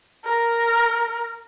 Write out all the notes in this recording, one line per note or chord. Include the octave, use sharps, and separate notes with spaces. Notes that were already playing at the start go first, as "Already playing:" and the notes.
A#4